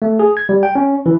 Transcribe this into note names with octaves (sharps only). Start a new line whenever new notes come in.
A3
G#4
G#6
G3
G5
C#4
E3